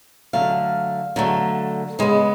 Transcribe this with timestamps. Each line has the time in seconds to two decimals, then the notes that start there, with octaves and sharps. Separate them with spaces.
0.33 D3 F#3 A3 F5
1.16 D3 F#3 A3
1.99 C#3 G#3 B3